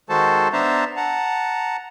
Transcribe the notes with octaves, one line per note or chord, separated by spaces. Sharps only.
D#3 G#3 F#4 A4 C5 A5
B3 D4 C5 E5 A5 A#5
F#5 A5 A#5